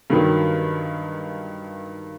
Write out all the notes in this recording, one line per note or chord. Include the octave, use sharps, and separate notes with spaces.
G2 D#3 F#3